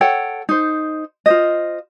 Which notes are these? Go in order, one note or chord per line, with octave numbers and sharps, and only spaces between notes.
A4 C#5 F#5 G5
D#4 C5
F4 C5 D#5